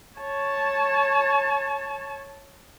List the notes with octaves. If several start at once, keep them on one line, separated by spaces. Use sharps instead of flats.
C#5 A5